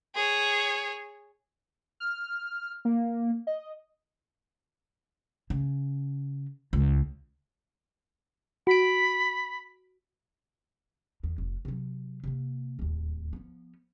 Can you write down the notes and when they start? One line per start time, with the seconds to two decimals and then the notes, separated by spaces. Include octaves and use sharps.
0.15 G#4 C#5
2.00 F6
2.85 A#3
3.47 D#5
5.50 C#3
6.73 C#2
8.67 F#4 B5 D7
11.23 E2
11.38 F1
11.65 C3 F#3
12.24 C3 A#3
12.79 D1 D#2
13.33 F3 B3